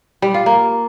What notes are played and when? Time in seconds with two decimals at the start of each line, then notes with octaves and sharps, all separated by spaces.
0.22 G3
0.34 F4
0.46 A#3